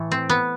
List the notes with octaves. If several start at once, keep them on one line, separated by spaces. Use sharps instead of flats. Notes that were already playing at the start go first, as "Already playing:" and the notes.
Already playing: A2 E3 A3
C4
B3